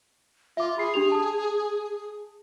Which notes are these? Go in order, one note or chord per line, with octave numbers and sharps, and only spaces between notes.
F4 E5 D6
G#4 B5 C7
D4 G4 F7
A5 D#6